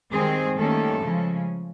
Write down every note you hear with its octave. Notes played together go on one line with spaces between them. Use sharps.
D#3 G3 G#3 C4 G#4
D#3 G3 A3 A#3 C#4 A4
C#3 F3 G#3 C#4